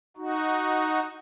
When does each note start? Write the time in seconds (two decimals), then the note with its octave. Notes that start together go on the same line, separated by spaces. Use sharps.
0.17 D#4 F#4